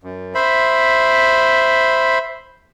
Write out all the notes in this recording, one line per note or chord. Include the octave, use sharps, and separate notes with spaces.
F#2
C5 E5 B5